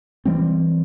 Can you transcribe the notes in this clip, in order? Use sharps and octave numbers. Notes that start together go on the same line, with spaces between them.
E3 G3 C4